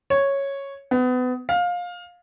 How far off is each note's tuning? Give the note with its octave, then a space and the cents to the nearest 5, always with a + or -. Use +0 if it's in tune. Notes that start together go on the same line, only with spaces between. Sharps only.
C#5 -5
B3 +30
F5 +20